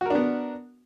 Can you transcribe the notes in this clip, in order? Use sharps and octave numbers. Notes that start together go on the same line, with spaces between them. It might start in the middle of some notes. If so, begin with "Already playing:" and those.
B3 D4 F#4 A#4